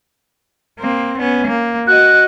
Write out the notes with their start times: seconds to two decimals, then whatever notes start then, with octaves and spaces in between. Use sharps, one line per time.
0.79 A#3 C4
1.18 B3 C#4
1.47 A#3
1.87 F#4 D#5 F#6